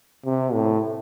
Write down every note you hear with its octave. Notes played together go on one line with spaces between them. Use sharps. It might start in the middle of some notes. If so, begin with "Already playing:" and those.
C3
A2